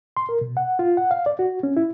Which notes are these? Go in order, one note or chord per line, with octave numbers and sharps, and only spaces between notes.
C6
A#4
B2
F#5
F4
F#5
F5
D5
F#4
C#4
E4